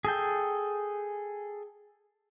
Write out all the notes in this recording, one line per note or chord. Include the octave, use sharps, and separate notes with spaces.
G#4 A4 G5